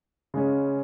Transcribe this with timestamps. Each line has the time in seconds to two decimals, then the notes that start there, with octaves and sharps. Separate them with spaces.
0.34 C#3 G#3 C#4